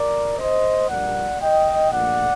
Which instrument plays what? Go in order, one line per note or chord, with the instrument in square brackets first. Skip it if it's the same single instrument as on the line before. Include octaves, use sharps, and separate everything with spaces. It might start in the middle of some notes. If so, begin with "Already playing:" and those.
Already playing: [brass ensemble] A#4 D5
C5 D#5
A#1 A#2 G3 A#3 D5 F#5
D#5 G5
A#1 A#2 A3 D5 F#5